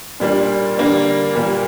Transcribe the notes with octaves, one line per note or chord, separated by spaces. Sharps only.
A#2 G3 A#3 D4
D3 G3 A#3 D4
A#2 G3 A#3